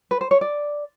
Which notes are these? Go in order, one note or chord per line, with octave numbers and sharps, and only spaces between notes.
B4
C5
C#5
D5